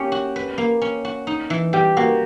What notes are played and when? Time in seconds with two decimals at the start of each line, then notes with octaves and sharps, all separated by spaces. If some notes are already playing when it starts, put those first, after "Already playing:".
Already playing: A#3 C#4 G4
0.12 F#4
0.36 B4
0.58 A#3
0.82 C#4
1.05 F#4
1.27 D#4
1.50 E3
1.73 G3 G4
1.97 A#3 F#4